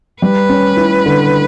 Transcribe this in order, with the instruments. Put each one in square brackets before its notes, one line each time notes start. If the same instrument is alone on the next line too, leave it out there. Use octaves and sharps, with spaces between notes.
[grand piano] G3 [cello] B4
[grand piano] C#4
E4
D3